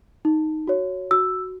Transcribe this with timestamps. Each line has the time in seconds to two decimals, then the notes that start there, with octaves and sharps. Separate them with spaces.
0.25 D#4
0.67 F#4 C#5
1.11 F#4 E6